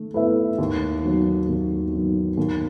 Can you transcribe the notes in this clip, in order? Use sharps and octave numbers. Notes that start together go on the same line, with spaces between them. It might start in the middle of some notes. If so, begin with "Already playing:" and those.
Already playing: D#3 A3
A3 E4 B4 E5
D#2
D#3 F#3
D#2
D#3 F#3
D#2